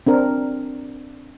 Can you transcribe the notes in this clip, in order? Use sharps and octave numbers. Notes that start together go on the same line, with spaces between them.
C4 D4 A#4